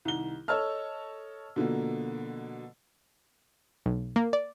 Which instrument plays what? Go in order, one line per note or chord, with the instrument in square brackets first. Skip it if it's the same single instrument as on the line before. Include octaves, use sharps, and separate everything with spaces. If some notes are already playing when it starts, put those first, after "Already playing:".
[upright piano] C2 D#3 G7
A4 C#5 D#5 A5 E6 F6
B2 D3 F3 A#3
[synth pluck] B1
A#3
D5